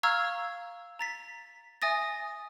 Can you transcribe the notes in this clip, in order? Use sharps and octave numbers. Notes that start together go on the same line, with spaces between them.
F5 A#5 C#6 E6 F6 G#6
A#5 A6 B6
E5 G#5 D#6 A6 A#6